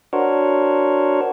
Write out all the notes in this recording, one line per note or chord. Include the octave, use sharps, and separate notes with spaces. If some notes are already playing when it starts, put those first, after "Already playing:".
D4 F#4 A#4 C5 C#5